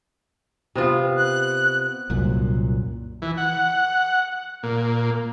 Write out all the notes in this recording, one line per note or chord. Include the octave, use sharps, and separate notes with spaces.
C3 B3 F4
F#6
C2 F#2 A#2
E3
F#5
A#2